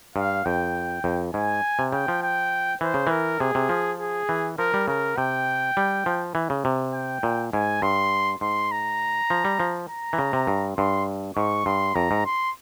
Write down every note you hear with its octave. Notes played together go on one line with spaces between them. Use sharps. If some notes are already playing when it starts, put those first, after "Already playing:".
G2 F5
F2 G5
F2
G#2 G#5
C3
C#3 G5
F3
G5
E3 C5
C#3
E3 A#4
C3 G#4
C3
F3
G#4
E3
F3 A#4
G3
C#3 A#4
C3 G5
G3
F3
E3
C#3
C3
G5
A#2
G#2 G#5
G2 C6
G#2 C6
A#5
F3
G3
F3
A#5
E3
C#3
C3
G2
G2 C6
G#2 C#6
G2 C6
F2 A#5
G#2
C6